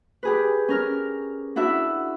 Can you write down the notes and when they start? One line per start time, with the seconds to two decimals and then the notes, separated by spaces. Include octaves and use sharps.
0.23 G4 G#4 B4
0.68 C#4 A#4 F6
1.56 D4 E4 F#4 E5 F#5